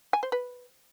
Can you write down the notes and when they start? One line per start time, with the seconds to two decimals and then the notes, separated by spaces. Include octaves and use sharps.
0.13 G#5
0.23 C5
0.32 B4